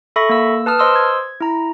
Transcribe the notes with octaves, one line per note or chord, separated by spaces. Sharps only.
A4 E5 B5 C#6 A#6
A#3 E6
B4 A5 D#6 F6
C5 D#5 C6 D#6 E6
G#6
E4 A#5